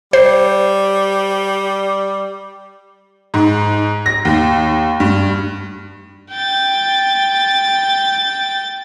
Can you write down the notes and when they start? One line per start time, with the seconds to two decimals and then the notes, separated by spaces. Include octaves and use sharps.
0.13 G3 C5
3.34 G#2
4.06 A#6
4.25 D#2
5.00 G2
6.32 G5 A6